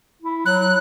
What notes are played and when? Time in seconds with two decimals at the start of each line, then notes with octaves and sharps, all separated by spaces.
0.22 E4
0.46 F#3 F#6